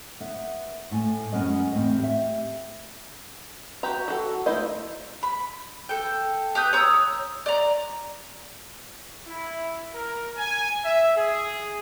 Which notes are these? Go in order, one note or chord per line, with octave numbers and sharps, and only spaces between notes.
B3 E5
A2 G#5
F#2 G#3 B3 C#4 A#4 D#5
E2 A2 C4 D#5
G4 E5
F#4 G4 A#5
F#4 A4
A3 D#4 E4 C5 D#5
B5
A4 G5
G4 B4 D#6 G6
C#5 A#5 D#6 E6
D5 A#5
E4
A#4
G#5
E5
G#4